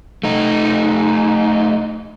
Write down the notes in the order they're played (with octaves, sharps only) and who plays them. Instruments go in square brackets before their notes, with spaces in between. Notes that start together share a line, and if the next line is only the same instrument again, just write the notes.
[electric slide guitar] A3 D#4